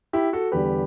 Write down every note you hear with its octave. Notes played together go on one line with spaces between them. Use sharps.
E4 G4
F#4 A4
E2 D3 G3 G4 B4